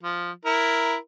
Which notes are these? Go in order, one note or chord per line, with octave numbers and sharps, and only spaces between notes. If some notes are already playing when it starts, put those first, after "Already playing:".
F3
E4 A#4